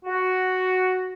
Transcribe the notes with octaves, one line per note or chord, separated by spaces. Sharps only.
F#4